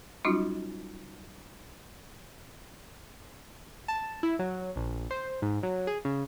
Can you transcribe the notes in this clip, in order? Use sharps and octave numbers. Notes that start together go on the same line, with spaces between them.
F#3 G3 C#4 D#4 F4 F#4
A5
E4
F#3
A#1
C5
G#2
F#3
G#4
C#3